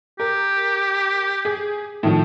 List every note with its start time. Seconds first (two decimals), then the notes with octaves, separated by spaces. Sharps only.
0.20 G4 A#4
1.45 G#4
2.03 A2 D#3 F3